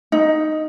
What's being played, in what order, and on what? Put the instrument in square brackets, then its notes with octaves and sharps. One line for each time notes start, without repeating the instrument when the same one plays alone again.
[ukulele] D#4